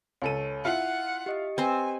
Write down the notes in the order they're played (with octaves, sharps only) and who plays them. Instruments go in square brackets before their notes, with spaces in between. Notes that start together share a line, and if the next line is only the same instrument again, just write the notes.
[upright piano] C#2 A4 D#7 [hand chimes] C#5
[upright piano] E4 F4 [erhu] F#5 [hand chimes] C#7
[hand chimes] G4 D#5 C#7
[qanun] C4 C5 [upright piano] B4 [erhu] G#5